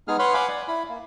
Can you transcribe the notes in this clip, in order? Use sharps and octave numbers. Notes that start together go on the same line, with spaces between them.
G#3 B3 D#4 G#4 F6
B4 C#5 F#5 B5 C6 F6
F5 F#5 G#5 B5 D6
D5
E4 B5
A#3